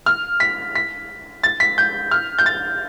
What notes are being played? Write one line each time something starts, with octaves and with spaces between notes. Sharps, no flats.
F6
B6
B6
A6
B6
G6
F6
G6
A6